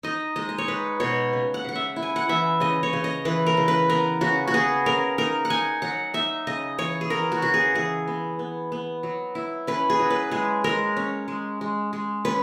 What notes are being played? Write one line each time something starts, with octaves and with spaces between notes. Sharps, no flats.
D#4 D#5
G#3 D#5
D#5
C#5
D#4 B4
B2 C#5
C#3
F#5
C#3 F#5
E5
E4
G#5
F#5
E3 E5
C#3 D#5
C#5
C#3
D#5
E3 B4
A#4
C#3
B4
B3 A#4
C#3 F#4
F#4
B3 G#4
C#3 A#4
D#4 A#4
F#5
D#4 G#5
F#3 F#5
D#4 E5
C#3 D#5
E3 C#5
G#4
B3 A#4
F#4
C#3 F#4
G#4
E3 G#4
B3
B3
B3
F#3
E4
C#4 B4
G#4
F#3
B4
G#3 G#4
G#3 A#4
C#4
G#3
G#3
G#3
C#4 B4